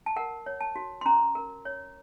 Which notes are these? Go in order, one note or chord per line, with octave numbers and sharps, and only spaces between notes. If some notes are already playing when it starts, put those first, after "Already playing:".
A5
A#4 F#5
C#5
A5
F#4
C6
C#4 A#5
A#4
C#5